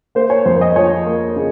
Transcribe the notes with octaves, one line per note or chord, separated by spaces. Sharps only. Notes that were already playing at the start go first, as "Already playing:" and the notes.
A#3 C5
C#5
F2 C5
D#5
F3 C#5
A#3
C#3